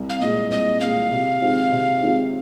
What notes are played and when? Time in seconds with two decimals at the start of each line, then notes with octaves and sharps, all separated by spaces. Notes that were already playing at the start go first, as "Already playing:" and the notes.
Already playing: C2
0.10 F5
0.20 A#2 G#3 D#5
0.50 C2 D#5
0.80 A#2 G#3 F5
1.11 C3
1.41 D#3 G#3 C4 F4
1.72 C3
2.03 D#3 G#3 C4 F4